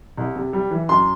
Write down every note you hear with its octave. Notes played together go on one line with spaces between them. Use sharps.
C2
C3
G3
E3
F#2 C6